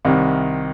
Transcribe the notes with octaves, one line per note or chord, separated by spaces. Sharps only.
C2 C3 D#3